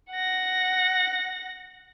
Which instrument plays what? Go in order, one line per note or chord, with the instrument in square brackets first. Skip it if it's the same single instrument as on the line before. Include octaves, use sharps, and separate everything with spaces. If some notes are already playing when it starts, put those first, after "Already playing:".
[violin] F#5 A#6